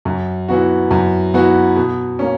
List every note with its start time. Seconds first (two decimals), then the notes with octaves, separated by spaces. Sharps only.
0.05 F#2
0.48 E3 B3 F#4
0.91 F#2
1.34 E3 B3 F#4
1.76 B2
2.19 A#3 C#4